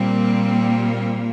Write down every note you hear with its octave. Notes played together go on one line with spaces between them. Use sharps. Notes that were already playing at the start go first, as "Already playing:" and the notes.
Already playing: A#2 G3 A#3 C4